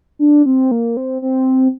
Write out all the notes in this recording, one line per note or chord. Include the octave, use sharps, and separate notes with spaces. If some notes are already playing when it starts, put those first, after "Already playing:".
D4
C4
A#3
C4
C4